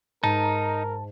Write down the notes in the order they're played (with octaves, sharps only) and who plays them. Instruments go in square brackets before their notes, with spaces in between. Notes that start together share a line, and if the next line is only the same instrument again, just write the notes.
[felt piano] G#2 [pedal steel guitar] D#4 [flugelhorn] A#4 [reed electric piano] A5